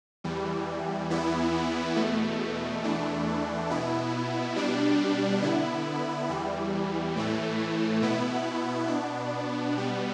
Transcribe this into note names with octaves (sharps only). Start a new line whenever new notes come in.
E2 E3 G3
E2 E3 B3 E4
E2 B2 A3
E2 E3 A3 D4
B2 B3 E4
B2 G3 D4
D3 B3 E4
E2 E3 G3
A2 E3 A3
B2 B3 E4
B2 B3 D4
B2 G3 B3